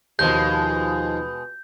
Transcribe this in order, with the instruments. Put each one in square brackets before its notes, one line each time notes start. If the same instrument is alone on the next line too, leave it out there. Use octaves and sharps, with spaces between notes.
[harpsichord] D#2 F3 [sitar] B2 G#3 [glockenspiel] G6